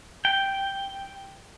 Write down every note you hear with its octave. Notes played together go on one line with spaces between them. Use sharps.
G5